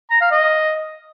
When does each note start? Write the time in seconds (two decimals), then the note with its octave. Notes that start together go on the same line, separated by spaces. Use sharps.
0.11 A#5
0.21 F5
0.32 D#5